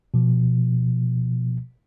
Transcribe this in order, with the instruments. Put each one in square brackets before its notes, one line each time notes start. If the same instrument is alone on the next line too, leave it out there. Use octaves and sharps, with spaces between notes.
[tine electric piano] B2 F3